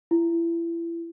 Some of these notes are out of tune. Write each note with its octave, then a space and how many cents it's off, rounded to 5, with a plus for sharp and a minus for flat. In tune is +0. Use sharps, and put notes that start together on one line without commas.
E4 +30